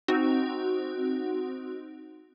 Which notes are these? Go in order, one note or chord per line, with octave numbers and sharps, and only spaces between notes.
C4 D#4 F#4